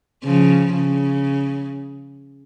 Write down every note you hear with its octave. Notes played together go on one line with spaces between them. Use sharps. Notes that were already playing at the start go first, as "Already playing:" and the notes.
C#3 F3
C#3